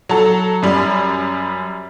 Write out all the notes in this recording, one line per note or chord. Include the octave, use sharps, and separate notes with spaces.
F#3 A4
F#2 G3